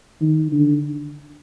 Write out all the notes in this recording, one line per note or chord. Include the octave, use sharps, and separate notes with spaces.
D#3
D3